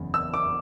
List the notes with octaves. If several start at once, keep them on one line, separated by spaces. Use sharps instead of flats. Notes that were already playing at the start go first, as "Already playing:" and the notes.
Already playing: F#1 E2 C#3
E6
D6